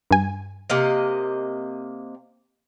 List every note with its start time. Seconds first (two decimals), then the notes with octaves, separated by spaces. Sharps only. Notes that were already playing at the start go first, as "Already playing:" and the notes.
0.11 G2 G#5
0.70 C3 A#3 D#5